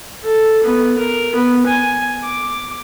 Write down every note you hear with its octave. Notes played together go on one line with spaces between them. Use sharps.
A4
B3
A#4
B3
G#5
D6